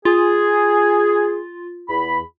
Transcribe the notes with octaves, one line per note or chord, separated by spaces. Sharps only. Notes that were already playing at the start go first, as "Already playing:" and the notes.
F4 G#4
E2 B5